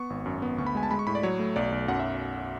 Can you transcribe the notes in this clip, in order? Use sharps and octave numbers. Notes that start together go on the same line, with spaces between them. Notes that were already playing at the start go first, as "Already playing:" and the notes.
Already playing: B3 C#6
G#1
F#2
B3
D2 C#6
B5
G#3 G#5
A5
G#3 B5
C#6
A2 B5
D5
F#3 C#5
A3
B1 D5
B1
F#2 F#5
E5